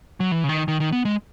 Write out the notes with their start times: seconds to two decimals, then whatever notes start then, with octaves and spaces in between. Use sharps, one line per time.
0.20 F#3
0.31 E3
0.44 C#3
0.49 D#3
0.68 D#3
0.80 D#3
0.92 B3
1.05 G#3